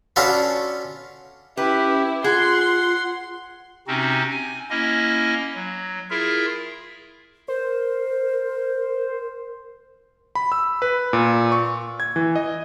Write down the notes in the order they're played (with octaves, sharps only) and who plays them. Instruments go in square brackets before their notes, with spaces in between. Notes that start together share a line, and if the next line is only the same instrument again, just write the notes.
[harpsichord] C#4 D4 F4 F#4 A4 B4
[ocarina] C#4 [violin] E4 [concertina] G4 [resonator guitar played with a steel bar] B4
[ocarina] F4 [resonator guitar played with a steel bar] G#4 [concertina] F#5 [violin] C6
[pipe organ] C3 C4 C#4 D#4 F#4
G#5
A#3 C#4 E4 D#5
F#3
E4 F4 G#4 A#4 E5
[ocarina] A#4 [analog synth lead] C5
[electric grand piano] B5
E6
B4
A#2
C#6
G#6
E3
D#5